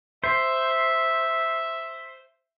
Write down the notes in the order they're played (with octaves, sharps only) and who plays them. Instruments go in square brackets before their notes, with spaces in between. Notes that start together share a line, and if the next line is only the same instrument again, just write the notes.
[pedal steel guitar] C5 [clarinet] E5